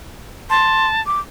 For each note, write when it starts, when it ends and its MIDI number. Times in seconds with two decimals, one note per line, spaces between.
0.50 1.01 81
0.50 0.88 84
1.06 1.20 86